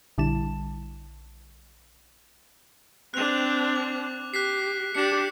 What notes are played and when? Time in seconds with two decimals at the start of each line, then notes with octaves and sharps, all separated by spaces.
0.18 A#1 D3 G3 E4 A5 E7
3.14 C4 D4 F#6 F7
3.76 D6
4.34 G4 F#6 B6 C7
4.95 D4 G4 C#7 E7